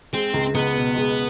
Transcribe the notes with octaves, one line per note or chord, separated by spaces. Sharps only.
G#3 C4
C#2
C#2 B3
B2
G#3